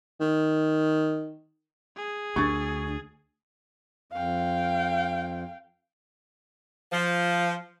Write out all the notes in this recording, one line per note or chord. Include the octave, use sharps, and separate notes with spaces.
D#3
G#4
D2 D4 C#6 G#6 A6
F2 F5 G5
F3